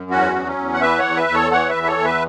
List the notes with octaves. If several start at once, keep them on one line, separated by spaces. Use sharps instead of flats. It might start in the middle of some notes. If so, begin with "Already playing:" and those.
Already playing: F#2
E2 C#4 F#4
F#3
C#4
E2
F#5
E3 B4 E5
C#5 F#5
E2
B4 E5
E2
A4 C#5
E3 C#5 F#5
B4 E5
E2
B4
A4 C#5
E2
B4 E5